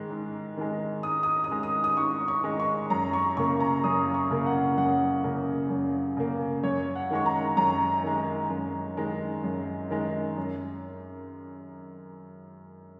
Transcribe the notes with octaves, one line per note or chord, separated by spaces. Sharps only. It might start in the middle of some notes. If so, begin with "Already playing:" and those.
Already playing: G#2 D#3 G#3
G#2
D#3 G#3
G#2 D#6
D#6
D#6
D#3 G#3
D#6
D#6
G#2 C#6
C#6
D#3 G#3
C#6
F#2 A#5
C#6
C#3 A#3 C#6
A#5
F#2 D#6
C#6
C#3 A#3
F#5
F#2 F#5
C#3 A#3
F#2
C#3 A#3
F#2 C#5
F#5
D#3 G#3 C#6
A#5
F#2 A#5
D#3 G#3
F#2
D#3 G#3
F#2
D#3 G#3
F#2